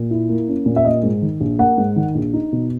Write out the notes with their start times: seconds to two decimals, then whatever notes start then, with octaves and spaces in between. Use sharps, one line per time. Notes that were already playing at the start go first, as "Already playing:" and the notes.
Already playing: A#2
0.11 E4
0.29 A#3
0.48 C#4
0.66 A#2
0.76 E5
0.85 A#3 D#5
1.03 G#2
1.22 D#3
1.40 A#1
1.59 A#3 F#5
1.78 G#2
1.96 D#3
2.15 A#1
2.33 D#4
2.53 B2